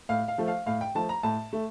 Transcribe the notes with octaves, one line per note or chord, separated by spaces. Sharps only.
A2 F5
F5
F3 A3
F5
A2 F5
G5
F3 A3 A5
A#5
A2 A5
A3